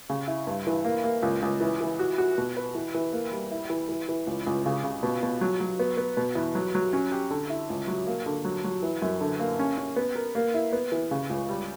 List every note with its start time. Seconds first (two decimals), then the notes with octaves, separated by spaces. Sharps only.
0.09 C#3
0.28 E4
0.47 G2
0.67 E3
0.85 A#3
1.04 A#3
1.22 C#2
1.42 C#2
1.60 E3
1.81 E3
1.99 F#4
2.18 F#4
2.38 B2
2.57 B4
2.75 E3
2.94 E3
3.13 A#3
3.32 G3
3.51 E4
3.70 E3
3.89 E3
4.09 E3
4.27 C#2
4.46 C#2
4.66 C#3
4.84 C#3
5.03 B2
5.23 B2
5.41 F#3
5.60 F#3
5.79 B3
5.97 B3
6.17 B2
6.35 E2
6.55 F#3
6.75 F#3
6.93 C#4
7.11 G4
7.30 D3
7.50 E4
7.70 C#2
7.87 F#3
8.07 A#3
8.26 D3
8.45 F#3
8.64 F#3
8.82 E3
9.02 F#2
9.21 D3
9.40 A#3
9.59 C#4
9.78 C#4
9.96 B3
10.15 A#4
10.35 A#3
10.54 E4
10.73 B3
10.92 E3
11.11 C#3
11.30 C#2
11.48 G3